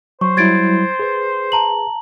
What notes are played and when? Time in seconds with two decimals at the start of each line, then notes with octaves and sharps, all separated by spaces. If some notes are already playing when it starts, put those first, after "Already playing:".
0.21 F#3 C5 C#6
0.37 F#3 G3 E4 G#6 A6 D7
0.99 G#4 B4
1.52 A5 A#5 F#7